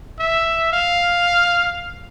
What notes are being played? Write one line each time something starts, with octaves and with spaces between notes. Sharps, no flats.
E5
F5